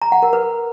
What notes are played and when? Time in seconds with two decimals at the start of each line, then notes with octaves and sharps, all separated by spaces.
0.02 A#5
0.12 F#5
0.22 A#4
0.33 B4